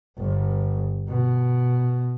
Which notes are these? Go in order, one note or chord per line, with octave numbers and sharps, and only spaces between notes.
G1
B2